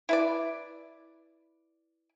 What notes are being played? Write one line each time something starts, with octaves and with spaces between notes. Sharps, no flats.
E4 B4 D5